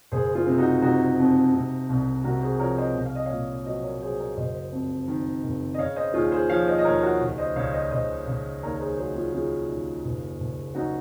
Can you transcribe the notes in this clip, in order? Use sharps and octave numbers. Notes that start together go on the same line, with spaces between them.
F#1 G#4 C5
F4 G#4
C3
D#4 F#4
C3 D#4 F#4
F2
C3
C2
C3 F#4 A#4
G#4 C5
F3 A#4 C#5
C5 D#5
C2
F5
D#5
A#2 C#5 F5
F#3 C5 D#5
A#4 C#5
F#3 G#4 C5
A#4 C#5
F#1 C5 D#5
F2
D#3
F#1
D#5
C#3 C#5 F5
C5 D#5
D#2 F4 G#4
G#4 C5
F3 C#5 F5
C5 D#5
D#5
D#2 A#4 C#5
F#4 A#4
C#2
C5 D#5
C#2 C#5 F5
C5 D#5
C#2 C5 D#5
C#2
D#2 A#4 C#5
A#4
G#4 C5
F#3 G#4 C5
F4 G#4
C#3 F4 G#4
D#2
F#1
F#1
F#2 D#4 F#4